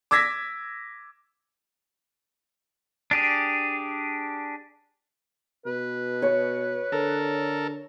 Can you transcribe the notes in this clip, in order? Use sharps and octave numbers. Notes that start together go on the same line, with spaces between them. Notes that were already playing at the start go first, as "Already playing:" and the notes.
D6 E6 G#6 A#6 B6
D4 G4 G#4
B2 B4
C#5
D3 A4 A#4